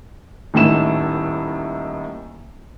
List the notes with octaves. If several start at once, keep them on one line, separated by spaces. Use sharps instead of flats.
D#1 A2 D#3 E4 E7